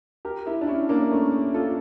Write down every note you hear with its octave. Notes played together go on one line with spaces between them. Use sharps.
G4 A#4
E4 G4
D4
C#4 E4
A#3 D4
A3 C#4
F4 A4